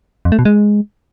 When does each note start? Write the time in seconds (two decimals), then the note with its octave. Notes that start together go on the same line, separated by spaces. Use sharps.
0.25 F2
0.32 A3
0.39 B2
0.45 G#3